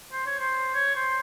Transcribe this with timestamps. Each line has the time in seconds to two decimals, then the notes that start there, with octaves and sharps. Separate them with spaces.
0.12 C5
0.27 C#5
0.39 C5
0.75 C#5
0.96 C5